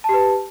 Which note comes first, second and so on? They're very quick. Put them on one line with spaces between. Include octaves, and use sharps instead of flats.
A5 G4 B4